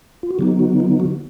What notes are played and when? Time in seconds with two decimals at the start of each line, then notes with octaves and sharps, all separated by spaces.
0.23 F4
0.31 F#4
0.39 D3 F#3 B3 D#4 G4
0.59 F#4
0.80 F4
1.00 F#4